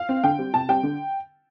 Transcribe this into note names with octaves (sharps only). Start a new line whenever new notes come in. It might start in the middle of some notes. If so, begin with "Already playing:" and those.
Already playing: F5
C4
D3 G5
G3 C4
C3 A5
G3 C4 G5
D3